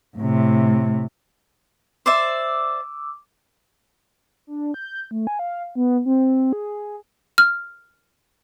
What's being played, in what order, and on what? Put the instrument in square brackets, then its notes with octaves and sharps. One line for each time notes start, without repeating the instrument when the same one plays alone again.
[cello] A2 C3
[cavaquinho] C5 D5 E5 [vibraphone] D6 E6
[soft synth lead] D4
G6
A3
G#5
F5
B3
C4
G#4
[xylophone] F6